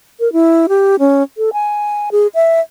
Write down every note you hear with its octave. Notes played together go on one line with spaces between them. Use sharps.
A#4
E4
G4
C#4
A4
G#5
G#4
E5